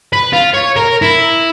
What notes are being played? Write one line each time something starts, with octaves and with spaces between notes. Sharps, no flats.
B4
F4
C#5
A#4
E4